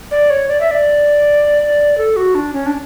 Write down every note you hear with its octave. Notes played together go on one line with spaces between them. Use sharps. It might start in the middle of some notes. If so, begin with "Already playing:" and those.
D5
C#5
D5
E5
D5
A4
F#4
D4
C#4
D4